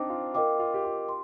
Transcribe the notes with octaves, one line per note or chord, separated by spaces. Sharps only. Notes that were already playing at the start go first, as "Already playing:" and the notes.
Already playing: C4 D4 D#4 C5 G5 D6
F4
F4 A#4 D#5 G5 D6
F4
G4
F4
C6